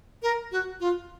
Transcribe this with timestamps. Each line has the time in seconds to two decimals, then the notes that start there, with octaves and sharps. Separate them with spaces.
0.23 A#4
0.52 F#4
0.80 F4